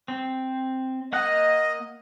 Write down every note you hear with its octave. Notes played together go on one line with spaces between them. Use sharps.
C4
A#3 D#5 F#5 F#6